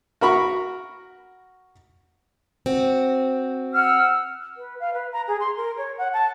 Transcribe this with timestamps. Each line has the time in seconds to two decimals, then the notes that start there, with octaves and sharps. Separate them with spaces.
0.21 F#4 A#4 B5 C#6
2.66 C4 F#4
3.74 F#5 E6 F6
4.57 B4
4.80 F5
4.94 B4
5.13 A#5
5.28 G#4
5.40 C6
5.57 A#4
5.78 C#5
5.98 F#5
6.13 A5